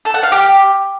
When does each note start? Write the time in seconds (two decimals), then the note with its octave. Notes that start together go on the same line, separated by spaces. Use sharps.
0.05 A4
0.14 F#5
0.23 F5
0.32 G4